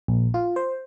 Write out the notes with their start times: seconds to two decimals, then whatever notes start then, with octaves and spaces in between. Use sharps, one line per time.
0.08 A#1
0.34 F4
0.56 C5